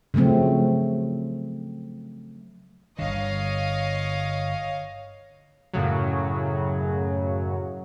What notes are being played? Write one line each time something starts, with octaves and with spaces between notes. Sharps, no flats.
C#3 F3 F#3 A3 C4
G1 D3 C#5 D#5 F5
F#2 A2 C#3 F#3